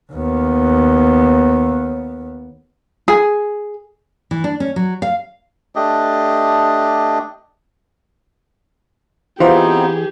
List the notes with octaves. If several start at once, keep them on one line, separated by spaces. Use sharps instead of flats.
D#2 B3
G#4
E3
D4
C#4
F#3
F5
A3 D4 G4 D#5
E3 B3 C4 D#4 F4 G4 G#4 C5